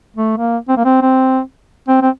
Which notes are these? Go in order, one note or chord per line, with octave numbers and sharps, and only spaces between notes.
A3
A#3
C4
A#3
C4
C4
C4
C4